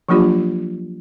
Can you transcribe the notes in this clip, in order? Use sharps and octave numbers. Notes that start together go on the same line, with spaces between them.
F3 F#3 A#3 D4 F4 G4